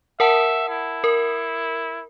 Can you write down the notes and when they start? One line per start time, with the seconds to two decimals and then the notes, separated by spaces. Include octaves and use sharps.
0.20 A#4 E5 F#5 A5
0.69 E4
1.04 A#4